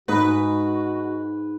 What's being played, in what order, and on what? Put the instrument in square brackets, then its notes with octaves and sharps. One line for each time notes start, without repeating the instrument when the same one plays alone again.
[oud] G#2 [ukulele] D#4 A#4 [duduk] F#4 [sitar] B4